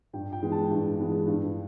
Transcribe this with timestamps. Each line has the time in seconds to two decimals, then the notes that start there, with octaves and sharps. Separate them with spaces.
0.13 G2 G5
0.32 G5
0.43 E3 G#3 B3
0.52 A5
0.70 G2
1.00 E3 G#3 B3
1.27 G2